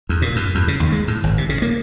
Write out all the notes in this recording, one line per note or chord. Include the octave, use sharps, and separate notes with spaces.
E2
A#2
F#2
E2
C#3
D#2
G#3
A2
G#1
C3
C#3
A#3